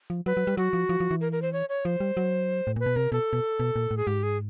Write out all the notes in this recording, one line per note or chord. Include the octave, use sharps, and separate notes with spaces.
F3
F#3 B4
F#3
G3
F#3 F#4
F3
F3
F3
E3
A#4
A#4
C5
C#5
C#5
F3 C5
G3
F#3
A2
A#2 B4
B2
C3 A#4
B2 A4
B2
B2
A#2
A2
G#4
G#2 G4
G#4